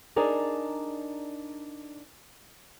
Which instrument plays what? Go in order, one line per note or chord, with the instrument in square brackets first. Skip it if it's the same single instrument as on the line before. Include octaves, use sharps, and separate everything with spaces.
[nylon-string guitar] D4 D#4 G#4 A#4 D5